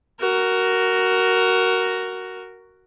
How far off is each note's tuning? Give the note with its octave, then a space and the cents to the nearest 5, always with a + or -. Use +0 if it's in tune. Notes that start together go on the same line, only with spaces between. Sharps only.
F#4 +10 A#4 +0